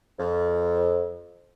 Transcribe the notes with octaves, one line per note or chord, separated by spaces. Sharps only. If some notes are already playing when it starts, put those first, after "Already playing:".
F2